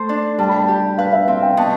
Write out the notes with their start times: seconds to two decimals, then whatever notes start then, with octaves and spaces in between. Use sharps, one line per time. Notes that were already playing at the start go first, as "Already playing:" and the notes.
Already playing: A3 A4 C5
0.09 D4
0.39 G3 A5
0.49 B5
0.59 A5
0.68 G4
0.98 B4 F5
1.13 E5
1.27 C4 F5
1.43 G5
1.57 B2 A5